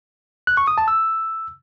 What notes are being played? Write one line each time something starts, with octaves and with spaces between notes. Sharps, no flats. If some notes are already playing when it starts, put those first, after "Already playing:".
F#6
C#6
D#6
A5
E6